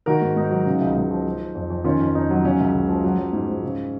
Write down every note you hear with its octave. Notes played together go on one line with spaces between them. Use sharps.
D#3 F#4 A#4
G#2
G#2 D#4
F#3
C#3
C#2
C#2
F3
F3
F3
F2
F2
D#3 C#4 F4
F2
F2 D#4
F#3
C#3 C#4
C#2
C#2
F3
F#3
F#3
G#2
G#2
C#3